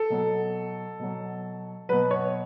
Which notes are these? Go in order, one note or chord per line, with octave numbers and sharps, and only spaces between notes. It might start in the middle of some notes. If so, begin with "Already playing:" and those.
Already playing: A4
B2 F#3
B2 F#3
B2 F#3 B4
C#5